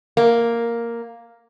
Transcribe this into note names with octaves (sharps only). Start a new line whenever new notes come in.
A#3